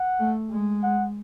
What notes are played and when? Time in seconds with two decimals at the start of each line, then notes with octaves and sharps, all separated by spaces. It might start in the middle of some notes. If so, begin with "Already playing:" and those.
Already playing: F#5
0.20 A3
0.51 G#3
0.83 F#5